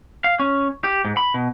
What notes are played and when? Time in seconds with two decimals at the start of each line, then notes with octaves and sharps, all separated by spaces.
0.24 F5
0.39 C#4
0.84 G4
1.05 G#2
1.17 B5
1.34 B2